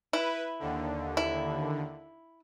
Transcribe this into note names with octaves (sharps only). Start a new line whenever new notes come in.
E4 B4
D#2 D3
E4